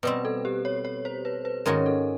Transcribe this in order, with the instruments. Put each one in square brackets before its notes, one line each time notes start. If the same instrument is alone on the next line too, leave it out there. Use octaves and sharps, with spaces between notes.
[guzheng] B2 G3 C4 [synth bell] B4
[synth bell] A4
G4
C#5
C#5
C5
B4
B4
[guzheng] G#2 D#3 G#3 C#4 F#4 [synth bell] A#4
[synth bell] A4